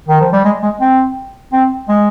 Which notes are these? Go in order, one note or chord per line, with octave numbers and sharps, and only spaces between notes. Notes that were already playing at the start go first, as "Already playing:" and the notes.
D#3
F3
G3
G#3
G#3
C4
C4
G#3